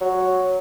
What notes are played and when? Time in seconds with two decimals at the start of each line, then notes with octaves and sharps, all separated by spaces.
0.01 F#3